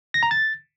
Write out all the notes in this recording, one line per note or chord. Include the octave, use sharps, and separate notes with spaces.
A#6
A#5
A6